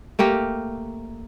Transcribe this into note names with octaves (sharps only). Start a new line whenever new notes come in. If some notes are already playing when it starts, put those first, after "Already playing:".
A3 A#3 G4 A#4